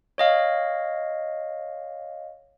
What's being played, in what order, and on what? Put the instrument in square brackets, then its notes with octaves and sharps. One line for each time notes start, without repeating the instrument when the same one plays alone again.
[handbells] C#5 D#5 F5